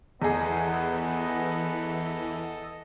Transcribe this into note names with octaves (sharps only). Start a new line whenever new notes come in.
E2 E3 B3 G#4 A4 D#5